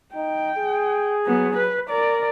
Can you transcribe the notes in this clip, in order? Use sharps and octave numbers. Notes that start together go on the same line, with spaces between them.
D#4 G5
G#4
F#3 B3
B4
A#4 D5